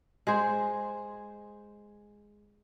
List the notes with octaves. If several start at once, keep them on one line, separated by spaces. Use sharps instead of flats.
G#3 G#4 C5